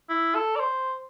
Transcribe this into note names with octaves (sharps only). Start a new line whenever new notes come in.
E4
A4
D5
C5